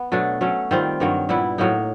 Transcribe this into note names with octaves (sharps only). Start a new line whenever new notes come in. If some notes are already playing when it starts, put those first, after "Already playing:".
Already playing: B3
B2 F#3 A3 D4
F#3 A3 C#4
D#3 G3 C4 F4
G2 D#3 F#3 A#3
A#2 G3 B3 E4
A2 F#3 A#3 D#4